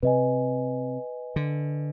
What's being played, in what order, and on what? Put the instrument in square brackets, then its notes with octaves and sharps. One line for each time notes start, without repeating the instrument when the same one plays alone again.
[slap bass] C3 [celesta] B4 D#5 G#5
[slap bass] D3